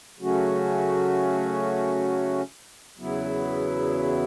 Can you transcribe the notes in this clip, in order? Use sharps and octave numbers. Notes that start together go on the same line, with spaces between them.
C#3 F#3 A3 C#4 F#4
E2 C#3 F#3 B3 E4